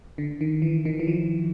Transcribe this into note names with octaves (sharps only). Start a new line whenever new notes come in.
D3
D#3
E3
D#3
E3
F3